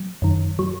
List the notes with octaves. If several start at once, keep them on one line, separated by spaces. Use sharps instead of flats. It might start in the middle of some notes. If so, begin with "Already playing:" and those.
Already playing: F#3
F#2 D#3
F#3